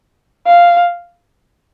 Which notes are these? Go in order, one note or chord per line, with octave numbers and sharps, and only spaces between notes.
F5